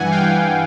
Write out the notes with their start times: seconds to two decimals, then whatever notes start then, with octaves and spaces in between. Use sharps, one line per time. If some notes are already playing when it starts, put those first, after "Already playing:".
Already playing: G2 E3 F#5 G#5
0.11 F5 G5